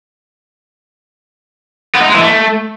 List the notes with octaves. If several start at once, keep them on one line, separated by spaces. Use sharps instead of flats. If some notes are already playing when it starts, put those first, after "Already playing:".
B3
D#4
G#3
E3
A3